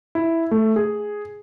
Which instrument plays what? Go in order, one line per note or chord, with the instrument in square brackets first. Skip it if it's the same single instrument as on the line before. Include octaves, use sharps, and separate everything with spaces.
[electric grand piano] E4
A3
G#4